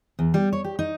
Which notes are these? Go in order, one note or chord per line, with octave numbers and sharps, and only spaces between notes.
E2
G3
C#5
G4
D#4